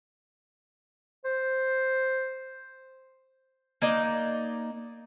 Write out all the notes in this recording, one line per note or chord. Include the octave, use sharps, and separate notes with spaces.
C5
A#3 D#4 D5